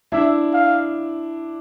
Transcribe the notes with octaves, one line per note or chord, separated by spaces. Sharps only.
D4 E4 E5
F5